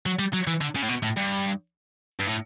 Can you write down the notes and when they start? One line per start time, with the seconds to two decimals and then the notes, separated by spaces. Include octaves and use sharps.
0.06 F#3
0.19 G3
0.33 F#3
0.47 E3
0.61 D3
0.75 C#3
0.83 A2
0.89 B2
1.03 A2
1.17 G2
2.20 G2
2.27 A2